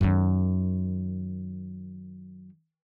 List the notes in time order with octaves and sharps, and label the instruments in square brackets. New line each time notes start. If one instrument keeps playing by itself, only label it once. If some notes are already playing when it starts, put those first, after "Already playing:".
[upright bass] F#2 D#3